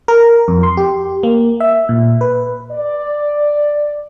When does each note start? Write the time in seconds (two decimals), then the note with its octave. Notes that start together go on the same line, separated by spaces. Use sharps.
0.08 A#4
0.48 F2
0.63 C6
0.77 G4
1.23 A#3
1.60 E5
1.89 A#2
2.21 B4
2.71 D5